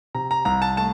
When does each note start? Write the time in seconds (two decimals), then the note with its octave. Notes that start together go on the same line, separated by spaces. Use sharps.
0.15 C3 A#5
0.31 A#5
0.45 C2 A#5
0.62 A5
0.77 A3 A5